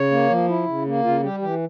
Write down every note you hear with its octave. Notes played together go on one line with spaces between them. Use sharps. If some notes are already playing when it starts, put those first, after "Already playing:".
Already playing: C#3 C#5
A#3
F3
E4
C#3
A#3
C#3 F4
G3 G4
E3 G4